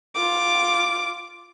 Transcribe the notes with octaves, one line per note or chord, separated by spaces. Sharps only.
F4 D6